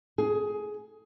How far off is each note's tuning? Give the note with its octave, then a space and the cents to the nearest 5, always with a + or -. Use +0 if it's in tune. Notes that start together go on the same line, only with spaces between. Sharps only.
G#4 +15